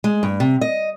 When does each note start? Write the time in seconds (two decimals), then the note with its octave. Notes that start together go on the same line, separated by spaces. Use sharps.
0.04 G#3
0.23 G2
0.40 C3
0.61 D#5